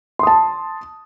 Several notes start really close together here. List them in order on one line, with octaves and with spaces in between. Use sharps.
C6 D#6 A5